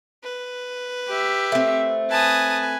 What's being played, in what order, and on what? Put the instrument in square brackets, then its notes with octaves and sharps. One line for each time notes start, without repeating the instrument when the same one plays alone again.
[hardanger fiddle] B4
[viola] G4 E5
[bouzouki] A3 C4
[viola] B4 G#5 [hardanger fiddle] A5 D#6